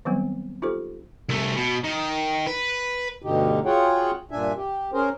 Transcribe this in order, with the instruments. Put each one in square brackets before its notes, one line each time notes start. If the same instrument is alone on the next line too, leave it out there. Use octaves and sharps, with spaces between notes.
[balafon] D#3 F#3 G3 B3 C4
D#4 F4 G4 A4 C5
[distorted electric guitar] C2 A3
B2
D#3
B4
[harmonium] D2 G2 B2 D3 D#4 G4
F4 F#4 G#4 C#5 F#5 G5
G2 A#2 D4 E5 G#5
G4
C#4 G#4 A#4 C5